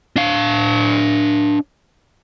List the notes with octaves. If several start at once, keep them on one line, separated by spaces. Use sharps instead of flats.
D4 F5